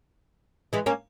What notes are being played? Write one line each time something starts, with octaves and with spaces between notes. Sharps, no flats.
E3 G#3
A#3 C#4